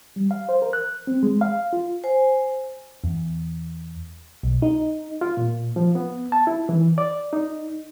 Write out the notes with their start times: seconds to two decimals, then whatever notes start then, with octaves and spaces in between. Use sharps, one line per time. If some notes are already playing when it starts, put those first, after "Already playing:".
0.16 G3
0.31 F5
0.49 C5
0.62 A#4
0.73 F#6
1.07 C4
1.23 G#3
1.41 F5
1.73 F4
2.04 C5 G#5
3.04 E2
4.43 B1
4.62 D#4
5.21 F4
5.37 A#2
5.76 F3
5.95 B3
6.32 A5
6.47 E4
6.69 E3
6.98 D5
7.33 D#4